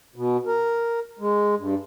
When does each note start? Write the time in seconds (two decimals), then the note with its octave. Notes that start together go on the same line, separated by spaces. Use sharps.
0.16 B2
0.46 A#4
1.19 G#3
1.58 G2